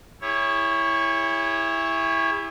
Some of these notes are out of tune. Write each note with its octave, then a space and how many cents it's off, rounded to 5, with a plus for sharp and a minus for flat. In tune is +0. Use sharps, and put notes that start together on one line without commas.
E4 +0 G#4 -45 C#5 +0